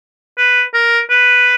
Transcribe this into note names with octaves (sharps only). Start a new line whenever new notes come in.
B4
A#4
B4